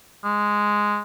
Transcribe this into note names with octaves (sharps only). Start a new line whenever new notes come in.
G#3